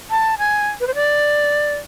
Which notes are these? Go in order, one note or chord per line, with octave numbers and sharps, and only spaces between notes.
A5
G#5
B4
C5
D5